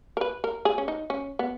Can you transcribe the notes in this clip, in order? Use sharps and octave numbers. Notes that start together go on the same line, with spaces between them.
A#4
B4
A#4
G#4
C#4
D#4
C#4
B3